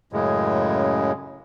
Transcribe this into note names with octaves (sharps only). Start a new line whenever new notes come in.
F#2 A2 C#3 G#3